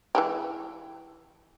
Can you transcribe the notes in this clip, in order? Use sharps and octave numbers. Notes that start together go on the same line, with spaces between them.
E3 G#3 G4